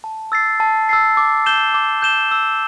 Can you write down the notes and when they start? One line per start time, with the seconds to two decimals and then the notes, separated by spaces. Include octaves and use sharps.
0.04 A5
0.32 E6 A6 C7
0.60 A5
0.89 E6 A6 C7
1.17 D6
1.46 G6 E7 G7
1.74 D6
2.02 G6 E7 G7
2.31 E6